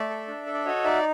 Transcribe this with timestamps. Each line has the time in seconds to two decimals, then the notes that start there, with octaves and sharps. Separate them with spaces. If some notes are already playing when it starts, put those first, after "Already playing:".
Already playing: A3 D5 E5
0.10 A4
0.28 D4
0.46 A4
0.54 D5
0.65 F#4 C#5 D#5
0.84 D#4 D5 E5